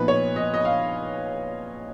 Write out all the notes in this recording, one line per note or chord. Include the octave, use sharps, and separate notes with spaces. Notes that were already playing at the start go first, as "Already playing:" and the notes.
Already playing: A#2 F3 B3 D#4 B4
C#5
D#5
D#5
F5